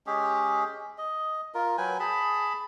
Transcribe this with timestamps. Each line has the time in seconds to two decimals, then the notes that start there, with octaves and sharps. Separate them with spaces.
0.07 G#3 C#4 G4 G#4
0.98 D#5
1.54 F4 A#4
1.78 F#3 B4 G5 G#5
2.00 G#4 A5 B5